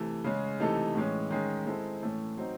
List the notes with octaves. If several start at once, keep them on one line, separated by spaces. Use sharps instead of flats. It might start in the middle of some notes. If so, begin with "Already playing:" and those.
Already playing: C3 E3 A3
C#3 G#3 C#4
C3 E3 A3 D#4 A4
A2 E3 G#3 C#4
D#3 G#3 C#4 G#4
G#3 C4 E4 A4
A2 E3 A3 C#4
F#3 C4 D#4